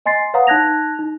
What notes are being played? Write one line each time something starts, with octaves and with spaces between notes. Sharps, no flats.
D#5 G#5 C6 A6 C7
B4 C#5 F5 F#5 A#5 D#6
D#4 A5 F#6 G#6 A#6 F7
D#4